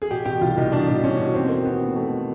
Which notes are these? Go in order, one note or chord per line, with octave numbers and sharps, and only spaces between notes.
G#4
B2 G4
B2 G4
C2 F4
C2 D#4
B2 D4
B2
B2 C#4
B2
D#2 C4
D#3
D#2 B3
D#2
D#3 A3